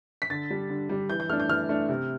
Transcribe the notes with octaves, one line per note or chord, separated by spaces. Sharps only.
B6
D3 A6
G3 D4
D3
G3 D4
E3 G6
G6
A3 D4 F6
G6
E3 F6
A3 D4
C3